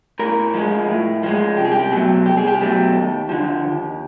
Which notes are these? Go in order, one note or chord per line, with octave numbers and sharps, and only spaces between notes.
A2 A#4
F3 G#3
A2
F3 G#3
C2 G4
G#4
G4
B2 F#3 A3
C2 G4
G#4
G4
B2 F#3 A3
D#2
D3 F3
D#2